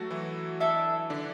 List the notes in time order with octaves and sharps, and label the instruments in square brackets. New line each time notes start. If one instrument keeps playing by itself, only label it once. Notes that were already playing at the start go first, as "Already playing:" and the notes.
Already playing: [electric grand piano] F#3 A3 F#4 A4
E3 E4
[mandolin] D4 A4 E5
[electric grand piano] D3 D4